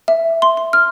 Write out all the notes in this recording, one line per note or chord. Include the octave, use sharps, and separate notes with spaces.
E5
C6
C6
F6